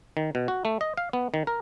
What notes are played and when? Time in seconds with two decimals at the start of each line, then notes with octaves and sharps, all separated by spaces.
0.17 D#3
0.35 B2
0.48 F#4
0.65 A3
0.81 D#5
0.97 F5
1.13 B3
1.34 D#3
1.47 A#4